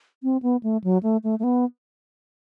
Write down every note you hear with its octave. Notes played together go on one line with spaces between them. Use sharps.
C4
B3
A3
F#3
A3
A3
A3
B3